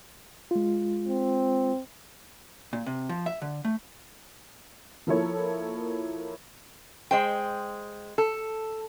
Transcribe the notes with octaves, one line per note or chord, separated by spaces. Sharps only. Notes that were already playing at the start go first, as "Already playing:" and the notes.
G#3 F4
C4
A#2
C3
F3
E5
D3
A3
F3 A#3 E4 A4 C#5
G#3 C5 G5
A4